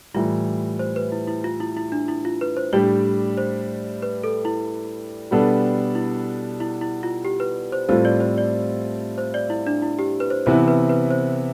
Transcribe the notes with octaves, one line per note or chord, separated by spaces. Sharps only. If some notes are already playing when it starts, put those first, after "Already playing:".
A2 E3 G3 F4
C5
B4
E4
E4
F4
E4
E4
D4
E4
F4
B4
C5
A2 G3 D4 G4 D5
C5
B4
A4
E4
B2 G3 B3 D4 A4
E4
E4
E4
F4
G4
B4
C5
A2 G3 C4 F4 A4 C5
D5
C5
D5
C5
D5
E4
D4
E4
G4
B4
C5
C3 E3 B3 E4 C5
B4
B4
C5